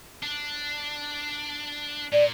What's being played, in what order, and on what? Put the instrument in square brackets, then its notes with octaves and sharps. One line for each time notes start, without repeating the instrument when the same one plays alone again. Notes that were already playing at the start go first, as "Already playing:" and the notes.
[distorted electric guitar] D4
[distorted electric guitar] A#2 [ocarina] D5